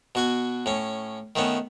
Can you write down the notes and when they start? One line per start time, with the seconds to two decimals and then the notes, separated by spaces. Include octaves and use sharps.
0.15 B2 F#4 G#5
0.66 A2 C#4
1.36 D#3 A3 B3 C#4